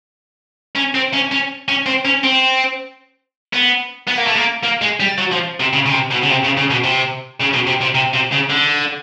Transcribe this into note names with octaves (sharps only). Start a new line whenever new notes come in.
C#4
C4
C#4
C#4
C#4
C4
C#4
C4
B3
B3
A#3
A3
A#3
A#3
G#3
G3
F#3
F3
C3
C#3
C#3
C3
B2
C#3
C3
C#3
C#3
B2
C3
C#3
B2
C3
C3
C3
C3
C#3
D3